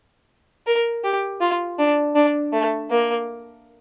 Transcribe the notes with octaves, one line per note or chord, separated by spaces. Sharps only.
A#4
G4
F4
D4
D4
A3
A#3